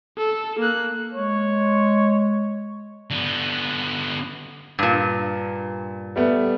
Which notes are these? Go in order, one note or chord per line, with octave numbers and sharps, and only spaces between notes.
A4
A#3 F#6
G#3 C#5
D3 B3
G2 A#2
G3 A3 B3